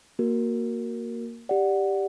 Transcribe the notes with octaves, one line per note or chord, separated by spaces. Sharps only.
A#3 F#4 A#4
G4 D5 F#5